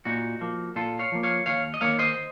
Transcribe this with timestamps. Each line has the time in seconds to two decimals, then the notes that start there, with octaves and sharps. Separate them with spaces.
0.05 A#2 D#4 F#4
0.41 F3 A#3
0.75 A#2 F4 A4
0.99 C#5 F5
1.12 F3 A#3
1.23 C#5 F5
1.46 D#2 C#5 F5
1.74 D#5
1.81 D#3 A#3 C#5 F5
1.99 C5 D#5